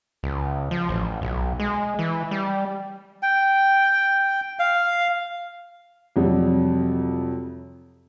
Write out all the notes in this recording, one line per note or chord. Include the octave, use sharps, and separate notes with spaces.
C#2
F3
A1
B1
G#3
E3
G3
G5
F5
F2 C3 F#3 G3